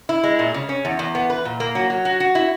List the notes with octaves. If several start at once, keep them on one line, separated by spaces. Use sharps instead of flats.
E4
G#3
A#2
C#3
C#4
E2
E2
B3
B4
A#2
A#3
F#3
F#3
F#4
F#4
E4